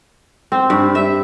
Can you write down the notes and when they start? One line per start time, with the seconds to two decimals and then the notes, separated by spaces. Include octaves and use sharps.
0.52 C4
0.70 G2
0.95 E5